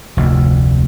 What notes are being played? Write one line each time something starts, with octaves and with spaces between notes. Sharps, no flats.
F1 D2